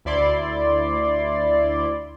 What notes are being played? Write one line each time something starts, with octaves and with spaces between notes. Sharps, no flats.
D2 E4 D5 C6